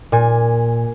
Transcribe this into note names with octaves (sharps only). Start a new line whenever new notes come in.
A#2 G#5